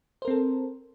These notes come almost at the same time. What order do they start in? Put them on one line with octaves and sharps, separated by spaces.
C5 A#4 C4 A4